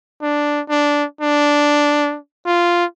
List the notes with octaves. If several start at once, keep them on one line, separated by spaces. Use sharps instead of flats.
D4
D4
D4
F4